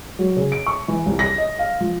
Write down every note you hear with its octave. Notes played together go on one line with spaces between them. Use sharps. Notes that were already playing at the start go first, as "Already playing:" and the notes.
F#3
C#3
D7
C#6
E3
C2
A#6
D#5
F5
F3